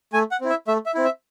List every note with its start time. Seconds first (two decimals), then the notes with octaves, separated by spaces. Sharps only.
0.13 A3 G#5
0.31 F#5
0.41 C4 E4
0.50 E5
0.67 A3 E5
0.86 E5
0.95 C4 E4
1.04 E5